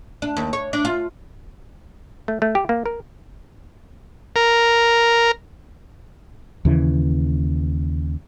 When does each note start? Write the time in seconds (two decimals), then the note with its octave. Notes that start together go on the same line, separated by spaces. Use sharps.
0.22 D4
0.37 D#2
0.53 C#5
0.73 D4
0.85 F4
2.28 A3
2.42 A3
2.55 G4
2.69 A#3
2.86 A#4
4.36 A#4
6.65 D#2 C#3 E3